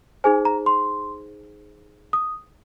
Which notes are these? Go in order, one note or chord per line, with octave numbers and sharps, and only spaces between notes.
D#4 G#4 C5 G#5
A#5
C6
D#6